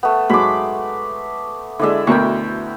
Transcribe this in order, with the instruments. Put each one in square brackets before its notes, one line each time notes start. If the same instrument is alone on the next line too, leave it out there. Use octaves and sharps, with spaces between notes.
[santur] A3 B3
[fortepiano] G#2 F#3 [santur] B5 D6
[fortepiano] D3 G#3 [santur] E4 D5 E5
[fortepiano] D2 B2 A#4 [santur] G5 C#6